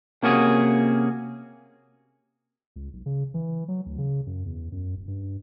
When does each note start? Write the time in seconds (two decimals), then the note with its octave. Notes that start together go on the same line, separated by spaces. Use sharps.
0.23 C3 A#3 C#4 F#4 G#4
2.76 C#2
2.93 B1
3.06 C#3
3.34 E3
3.68 F#3
3.86 D2
3.98 C#3
4.27 F#2
4.46 E2
4.72 F#2
4.96 D1
5.08 G2